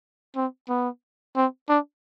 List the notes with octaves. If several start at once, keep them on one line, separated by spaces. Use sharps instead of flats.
C4
B3
C4
D4